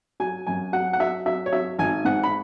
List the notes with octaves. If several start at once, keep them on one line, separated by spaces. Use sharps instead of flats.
F#3 G#5
F#2 G#5
F#3 F#5
F#5
F#3 E5
F#3 E5
C#5
F#3 E5
G#1 G#5
G#2 F#5
B5